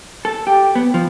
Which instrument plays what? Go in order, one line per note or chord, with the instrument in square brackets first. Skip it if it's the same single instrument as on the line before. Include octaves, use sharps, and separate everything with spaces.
[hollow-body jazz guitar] A4
G4
B3
F3